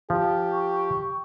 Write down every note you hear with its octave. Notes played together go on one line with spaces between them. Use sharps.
F3 G4
C#6